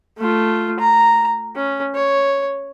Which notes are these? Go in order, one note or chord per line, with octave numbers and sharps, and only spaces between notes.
A3 F4
A#5
C#4
C#5